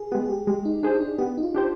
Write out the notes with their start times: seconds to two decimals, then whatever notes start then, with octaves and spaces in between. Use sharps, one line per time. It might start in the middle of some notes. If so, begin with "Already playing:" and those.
Already playing: G#4
0.11 G#3 B3 G4
0.25 G#4
0.30 G4
0.47 G#3 G4
0.65 D#4
0.83 D4 D#4 G#4 C5
0.95 D#4
1.01 D4
1.18 B3 G4
1.37 D#4
1.43 F4
1.54 D4 G4 C5